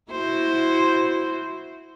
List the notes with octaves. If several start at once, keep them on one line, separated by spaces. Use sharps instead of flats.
E4 F#4 C5